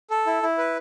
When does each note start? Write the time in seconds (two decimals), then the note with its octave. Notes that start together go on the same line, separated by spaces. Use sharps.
0.11 A4
0.27 E4
0.43 E4
0.58 B4